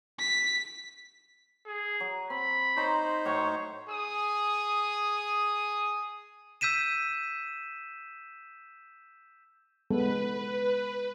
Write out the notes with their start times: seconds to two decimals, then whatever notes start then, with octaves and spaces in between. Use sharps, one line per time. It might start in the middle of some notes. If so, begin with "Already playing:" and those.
0.20 B6
1.67 G#4
2.00 F#3
2.30 C4 B5
2.77 D#4 C5 C#5 A#5 C6
3.25 A2 F#3 C#5 C#6
3.89 G#4 D#6
6.61 E6 G6 B6 D#7 E7
9.91 G#3 B3 A4 B4